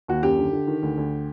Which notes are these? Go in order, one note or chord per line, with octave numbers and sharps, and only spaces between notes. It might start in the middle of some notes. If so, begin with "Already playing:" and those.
D#2 F#4
F#2 G4
D3
D3
D#3
D2
D2